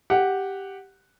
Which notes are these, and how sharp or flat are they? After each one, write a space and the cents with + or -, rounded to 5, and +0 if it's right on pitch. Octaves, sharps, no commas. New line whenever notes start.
G4 +0 F#5 +0